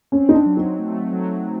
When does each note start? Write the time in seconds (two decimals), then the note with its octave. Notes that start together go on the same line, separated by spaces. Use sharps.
0.12 C4 C#4
0.29 D#4
0.34 D4
0.46 F#3
0.57 D#4
0.79 A3
1.12 F#3